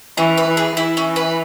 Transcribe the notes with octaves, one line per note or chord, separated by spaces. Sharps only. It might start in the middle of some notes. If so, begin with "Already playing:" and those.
E3 C#4
B4
E3
G#4
E3 E4
C#4
B4